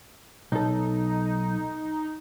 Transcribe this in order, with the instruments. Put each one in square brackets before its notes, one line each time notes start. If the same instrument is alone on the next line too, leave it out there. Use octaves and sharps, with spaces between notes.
[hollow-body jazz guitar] B1 A4 [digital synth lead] D#4